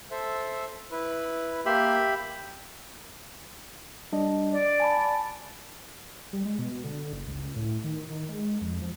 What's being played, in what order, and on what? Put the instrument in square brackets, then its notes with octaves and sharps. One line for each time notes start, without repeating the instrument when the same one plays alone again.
[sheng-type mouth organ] A4 C5 E5
E4 B4
[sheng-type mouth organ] A#3 C6 [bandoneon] G4 E5 B5
[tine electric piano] G3 D4 D#5
[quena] D5
[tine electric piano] G#5 A5 B5
[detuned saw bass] G3
G#3
B2
D3
F#1
C#2
A2
D#3
D#3
G#3
F2
F3